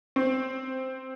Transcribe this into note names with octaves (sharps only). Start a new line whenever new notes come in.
C4